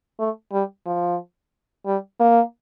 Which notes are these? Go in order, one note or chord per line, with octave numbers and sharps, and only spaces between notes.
A3
G3
F3
G3
A#3